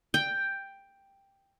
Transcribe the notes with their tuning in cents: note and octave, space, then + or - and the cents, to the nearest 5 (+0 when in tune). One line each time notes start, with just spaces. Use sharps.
G5 +5